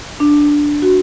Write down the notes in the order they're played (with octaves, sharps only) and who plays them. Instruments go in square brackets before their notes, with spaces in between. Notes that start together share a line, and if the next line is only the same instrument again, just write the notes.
[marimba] D4
F#4